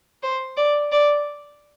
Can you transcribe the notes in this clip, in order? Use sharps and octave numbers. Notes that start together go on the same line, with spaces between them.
C5
D5
D5